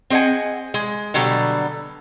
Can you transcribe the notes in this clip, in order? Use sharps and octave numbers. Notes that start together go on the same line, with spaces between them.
C4 G#4 D#5 F#5 G#5
G#3
B2 D3 F#3 G3